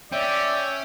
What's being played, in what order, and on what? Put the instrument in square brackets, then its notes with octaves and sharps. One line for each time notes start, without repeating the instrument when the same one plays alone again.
[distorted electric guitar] C#4 [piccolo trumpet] D5 [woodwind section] E5 [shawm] G5